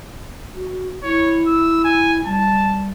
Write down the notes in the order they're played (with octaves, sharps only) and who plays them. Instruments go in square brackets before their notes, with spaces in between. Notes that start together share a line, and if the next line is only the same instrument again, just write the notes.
[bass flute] F#4
[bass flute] E4 [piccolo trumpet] C#5
[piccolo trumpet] E6
G#5
[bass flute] G3 [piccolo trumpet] A5